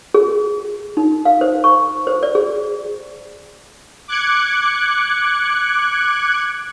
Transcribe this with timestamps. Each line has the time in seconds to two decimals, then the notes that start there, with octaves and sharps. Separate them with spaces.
0.14 G#4
0.97 D#4
1.25 F5
1.41 C5
1.64 C#6
2.07 C5
2.23 D5
2.35 G#4
4.08 D6 F#6 G#6 C#7